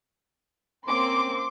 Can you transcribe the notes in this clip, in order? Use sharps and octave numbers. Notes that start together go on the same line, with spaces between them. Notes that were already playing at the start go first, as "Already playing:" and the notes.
A#3 C4 C#4 C6 D6